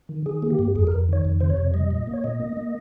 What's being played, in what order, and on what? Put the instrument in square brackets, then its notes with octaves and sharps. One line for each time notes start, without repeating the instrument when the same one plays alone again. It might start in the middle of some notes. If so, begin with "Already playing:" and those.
[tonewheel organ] D#3
D#3 G#4
A#3
G4
G2
F2 G#4
A#4
F2
D#3 C#5
F2
C3 C5
C#5
F2
G3 D#5
A#2
A#3
C#5
A#2 D#5
A#3
A#3